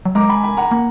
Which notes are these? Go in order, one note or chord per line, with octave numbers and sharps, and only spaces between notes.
F#3
G#3 A#5 D6
G#5 B5
G#5 B5
F#5 A#5
A#3